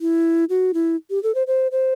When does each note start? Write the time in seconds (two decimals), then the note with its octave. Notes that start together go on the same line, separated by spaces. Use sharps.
0.01 E4
0.49 F#4
0.74 E4
1.10 G4
1.23 A4
1.35 C5
1.47 C5
1.72 C5